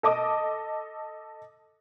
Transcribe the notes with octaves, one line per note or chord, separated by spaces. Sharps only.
A4 D#5 D6 D#6